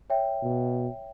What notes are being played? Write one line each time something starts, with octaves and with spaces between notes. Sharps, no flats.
C#5 E5 G5
B2